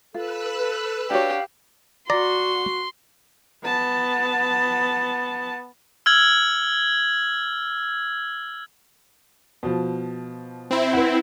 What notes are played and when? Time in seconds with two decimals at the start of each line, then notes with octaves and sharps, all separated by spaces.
0.14 F4 A4 B4 E6 F#6
1.10 D4 F#4 G4 C#5 F5
2.10 F#4 D5 A#5 C6
3.63 B3 A5
6.06 E6 F6 G#6 F#7
9.63 B2 F3
10.71 C4 E4
10.93 B4 F#5